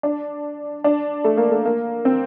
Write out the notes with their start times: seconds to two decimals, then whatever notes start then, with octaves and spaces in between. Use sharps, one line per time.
0.03 D4
0.84 D4
1.24 A3
1.37 A#3
1.51 A3
1.65 A#3
2.05 C4